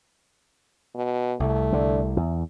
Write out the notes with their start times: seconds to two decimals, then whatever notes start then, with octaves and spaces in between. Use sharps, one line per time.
0.95 B2
1.40 C2 A3
1.73 D3
2.17 E2